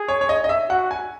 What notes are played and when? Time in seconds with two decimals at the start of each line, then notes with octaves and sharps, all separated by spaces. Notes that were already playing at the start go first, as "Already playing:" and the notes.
Already playing: G#4
0.08 C#5
0.21 C#5
0.29 D#5
0.44 D#5
0.49 E5
0.69 F#4 F#5
0.91 G#5